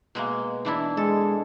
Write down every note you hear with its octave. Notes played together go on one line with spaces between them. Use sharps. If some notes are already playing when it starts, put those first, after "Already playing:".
B2 G#3 A#3
E3 D4 E4
G#3 A4